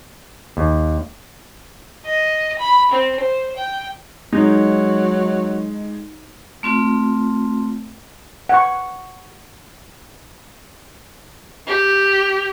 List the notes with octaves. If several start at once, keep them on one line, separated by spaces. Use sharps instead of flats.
D#2
D#5
B5
C4
C5
G5
F#3 G#3 D#4
A3 C4 F4
F#5 C#6
G4